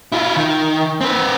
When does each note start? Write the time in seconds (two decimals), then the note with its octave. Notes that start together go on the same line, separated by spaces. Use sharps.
0.12 E4 F4
0.36 D#3
1.01 C4 B4